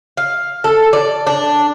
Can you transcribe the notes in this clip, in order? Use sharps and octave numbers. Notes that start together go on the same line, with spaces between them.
F5
A4
D5
D4